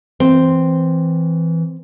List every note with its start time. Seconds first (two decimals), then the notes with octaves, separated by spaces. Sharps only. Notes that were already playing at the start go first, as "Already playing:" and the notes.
0.20 E3 C4